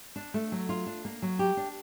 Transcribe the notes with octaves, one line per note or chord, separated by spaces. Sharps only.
D4
A3
F#3
F4
D4
A#3
F#3
G4
D4